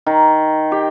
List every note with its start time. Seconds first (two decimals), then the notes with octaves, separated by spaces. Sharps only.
0.06 D#3
0.72 G4